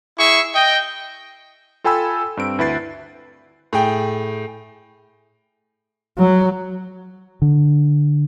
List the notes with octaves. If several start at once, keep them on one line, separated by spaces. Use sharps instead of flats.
E4 G#4 E5 C#6
D#5 G5
F4 A4 G5 G#5 B5 E6
G2 C4 D7
D2 E4 B4 A6 C7
A2 G#4 G5
F#3
D3